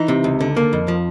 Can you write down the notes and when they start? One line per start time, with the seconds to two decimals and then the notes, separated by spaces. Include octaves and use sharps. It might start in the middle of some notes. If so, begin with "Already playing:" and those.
Already playing: E3 D#4
0.08 C3
0.24 C#2
0.41 D3
0.57 A#3
0.73 F2
0.88 F3